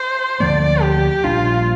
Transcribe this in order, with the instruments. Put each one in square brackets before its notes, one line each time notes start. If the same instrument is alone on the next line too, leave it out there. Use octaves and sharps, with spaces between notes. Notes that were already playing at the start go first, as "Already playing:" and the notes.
Already playing: [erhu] C5
[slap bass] D2 D3 F3 A#3 [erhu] D5
[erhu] G4
[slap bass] A#1 A#2 G3 D4 [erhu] F4